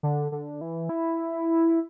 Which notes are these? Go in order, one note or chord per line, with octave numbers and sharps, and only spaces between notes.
D3
D3
E3
E4